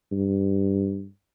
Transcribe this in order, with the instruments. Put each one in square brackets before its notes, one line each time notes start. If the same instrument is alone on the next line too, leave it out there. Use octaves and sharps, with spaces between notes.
[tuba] G2